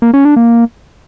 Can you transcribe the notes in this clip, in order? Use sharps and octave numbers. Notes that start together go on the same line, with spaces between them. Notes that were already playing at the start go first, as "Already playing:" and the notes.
A#3
C#4
D4
A#3